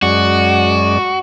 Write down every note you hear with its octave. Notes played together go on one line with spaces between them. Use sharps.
F#2 G#3 F#4 D5